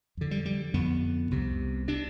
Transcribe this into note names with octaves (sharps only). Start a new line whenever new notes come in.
F2 D3
G3
G3
F2 D3 B3
C2 C3
C3 D4